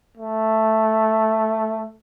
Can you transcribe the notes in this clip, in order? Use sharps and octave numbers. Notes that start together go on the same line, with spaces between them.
A3